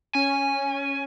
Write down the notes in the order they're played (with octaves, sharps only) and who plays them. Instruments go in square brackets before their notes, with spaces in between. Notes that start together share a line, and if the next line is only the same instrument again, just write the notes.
[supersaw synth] C#4 [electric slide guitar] G#5